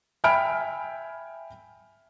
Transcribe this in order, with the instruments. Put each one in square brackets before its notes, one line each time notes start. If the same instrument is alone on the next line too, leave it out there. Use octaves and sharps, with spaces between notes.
[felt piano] E5 G5 G#5 B5 F6 D7